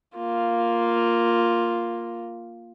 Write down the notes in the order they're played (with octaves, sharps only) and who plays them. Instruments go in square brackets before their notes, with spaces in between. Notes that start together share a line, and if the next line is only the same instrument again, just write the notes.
[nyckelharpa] A#3 F4